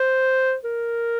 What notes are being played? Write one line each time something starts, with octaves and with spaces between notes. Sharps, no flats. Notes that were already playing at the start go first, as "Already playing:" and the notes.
Already playing: C5
A#4